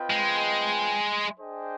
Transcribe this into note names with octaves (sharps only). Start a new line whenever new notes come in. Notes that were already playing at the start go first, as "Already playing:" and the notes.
Already playing: C4 F4 B4 D#5 G5
G#3
D4 G#4 C5 D#5 G5